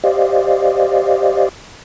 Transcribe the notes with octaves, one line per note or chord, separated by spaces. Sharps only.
G4 C5 D5 D#5 F5